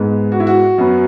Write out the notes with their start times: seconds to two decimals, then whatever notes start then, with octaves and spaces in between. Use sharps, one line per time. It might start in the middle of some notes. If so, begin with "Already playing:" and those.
Already playing: G#2 G#3 B3
0.32 F#4
0.40 E4
0.47 F#4
0.78 F#2 F#3 B3